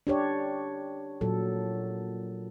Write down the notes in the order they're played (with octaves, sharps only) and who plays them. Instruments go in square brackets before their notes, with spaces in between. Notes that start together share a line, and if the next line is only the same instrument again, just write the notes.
[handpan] D4 G4 C#5
A#2 F#3 A4